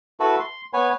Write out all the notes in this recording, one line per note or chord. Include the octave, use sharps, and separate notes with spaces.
E4 F#4 A4 B4
C6
B3 B4 C#5 G#5